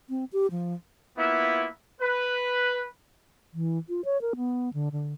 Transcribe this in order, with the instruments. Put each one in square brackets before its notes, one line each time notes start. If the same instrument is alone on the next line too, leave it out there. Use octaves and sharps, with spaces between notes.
[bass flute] C4
G4
F3
[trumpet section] A#3 B3 E4 F4 E5
B4
[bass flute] E3
F4
C#5
A#4
B3
D3
D3